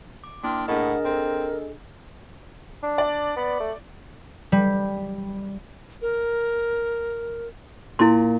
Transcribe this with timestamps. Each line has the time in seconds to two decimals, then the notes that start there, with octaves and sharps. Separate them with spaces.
0.24 D6
0.44 A#3 D4 E4 G5 C6 F6
0.68 A2 D4 G#4 A#4 D#5 F#5
1.05 C4 A4
2.83 D4
2.98 D5
3.36 B3
3.60 A3
4.52 G3
6.02 A#4
7.99 A#2 E4 C6